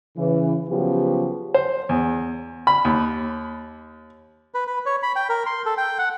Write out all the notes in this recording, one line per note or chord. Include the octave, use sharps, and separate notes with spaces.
C#3 E3
C#3 F3 F#3 B3 F#4 G4
C5
E2
B5
D#2
B4
B4
C#5
B5
G5
A#4
C6
A4
G5
F#5